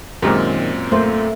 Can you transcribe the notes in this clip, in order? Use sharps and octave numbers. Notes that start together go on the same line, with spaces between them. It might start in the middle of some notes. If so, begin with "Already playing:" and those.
F#2 A#2 D#3 G#3 C4 G4 A#4
A3 A#3 C5